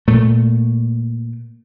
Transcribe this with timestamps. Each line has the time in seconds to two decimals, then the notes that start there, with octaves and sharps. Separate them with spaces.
0.08 A#2 A3